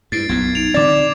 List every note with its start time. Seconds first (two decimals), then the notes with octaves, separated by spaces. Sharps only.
0.12 G2 E4 A6 C7 D7
0.29 B1 F#2 A#2 B3 G#6
0.55 D#4 D7 F7
0.74 D3 C4 D5 D6 A6